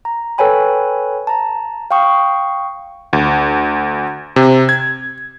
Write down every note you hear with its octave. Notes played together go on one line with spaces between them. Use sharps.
A#5
A4 B4 C#5 G5 G#5 B5
A5 A#5
F5 G5 C#6 D#6
D2
C3
G#6